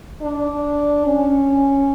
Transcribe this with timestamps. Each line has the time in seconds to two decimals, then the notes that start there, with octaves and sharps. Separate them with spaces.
0.22 D4
1.06 C#4